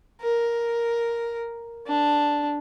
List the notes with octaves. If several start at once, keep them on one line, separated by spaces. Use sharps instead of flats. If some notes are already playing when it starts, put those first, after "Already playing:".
A#4
D4